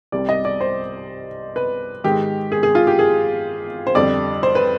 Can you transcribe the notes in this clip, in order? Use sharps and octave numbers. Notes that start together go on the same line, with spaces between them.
C2 C3 G3 D5
D#5
D5
C5
B4
G#2 D#3 G#3 G4
G#4
G#4
F4
G4
G#4
C5
F2 D3 G3 D5
C5
B4